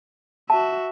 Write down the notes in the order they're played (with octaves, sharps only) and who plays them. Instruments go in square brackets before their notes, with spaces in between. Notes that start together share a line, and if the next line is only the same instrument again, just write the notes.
[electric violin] F#4 E5 [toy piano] A5